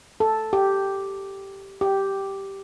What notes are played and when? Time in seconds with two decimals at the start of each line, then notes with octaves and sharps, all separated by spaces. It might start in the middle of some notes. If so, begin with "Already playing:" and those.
0.20 A4
0.53 G4
1.81 G4